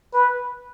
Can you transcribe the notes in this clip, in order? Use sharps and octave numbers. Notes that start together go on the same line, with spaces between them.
B4